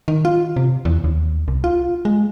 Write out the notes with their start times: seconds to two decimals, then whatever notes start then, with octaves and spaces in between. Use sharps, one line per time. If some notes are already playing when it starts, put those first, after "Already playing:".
0.08 D#3
0.25 F4
0.56 C3
0.85 E2
1.04 D#2
1.48 C2
1.64 F4
2.05 G#3